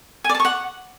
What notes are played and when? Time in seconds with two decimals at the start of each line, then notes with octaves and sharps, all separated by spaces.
0.24 G#5
0.29 D5
0.35 A5
0.40 C#6
0.45 F#5